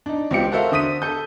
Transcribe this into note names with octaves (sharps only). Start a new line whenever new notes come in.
D4 D#4
C#2 C4 F4 G4 C#7
F#4 A4 A#4 C5 E5 F5
D3 C5 D#6 B6 D#7
A4 G6